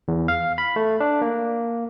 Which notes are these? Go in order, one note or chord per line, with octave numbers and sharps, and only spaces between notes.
E2
F5
B5
A3
D4
A#3